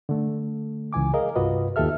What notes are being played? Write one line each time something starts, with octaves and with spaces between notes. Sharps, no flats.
D3 A3
C#2 E3 G#5 D6
G#4 A#4 D#5 F5
C2 G2 F4 F#4 B4 D#5
D#2 F4 G4 A4 E5 F6